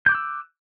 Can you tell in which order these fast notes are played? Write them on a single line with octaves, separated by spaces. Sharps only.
G6 D6 F#6 E6